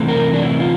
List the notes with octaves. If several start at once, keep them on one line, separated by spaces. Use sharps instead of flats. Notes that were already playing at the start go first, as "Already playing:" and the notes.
Already playing: C3 E3 A3
A#4
D4
E4
F4